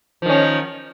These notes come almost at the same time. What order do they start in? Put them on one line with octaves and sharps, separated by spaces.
F3 D#3 C#4